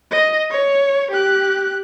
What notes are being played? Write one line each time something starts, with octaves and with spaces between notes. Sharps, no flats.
D#5
C#5
G4 F#6